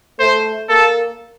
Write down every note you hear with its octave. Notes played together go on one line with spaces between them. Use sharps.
A3 C5
A#3 A4